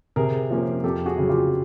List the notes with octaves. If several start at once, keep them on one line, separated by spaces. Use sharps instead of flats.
C3 G#4 A#4
F3 A#3 C#4
F2 G4 A4
F#4 G#4
C#3 F#3
F4 G4